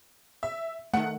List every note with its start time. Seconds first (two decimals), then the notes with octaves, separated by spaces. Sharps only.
0.43 E5
0.94 D#3 A3 F#5